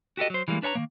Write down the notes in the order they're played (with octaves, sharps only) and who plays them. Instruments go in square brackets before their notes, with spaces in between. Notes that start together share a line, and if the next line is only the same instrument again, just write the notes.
[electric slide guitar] F#4 G4 A4 D#5
F#3 C5
E3 G3 G#3 A#3
D4 B4 C#5 A5 A#5
D#3 E3 A#3